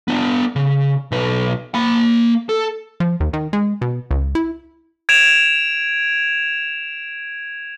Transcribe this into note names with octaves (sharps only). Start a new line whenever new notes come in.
B3 D4
C#3
B1 B4
A#3 B5
A4
F3
D#2
D#3
G#3
B2
C#2
E4
G#6 D7 E7 F7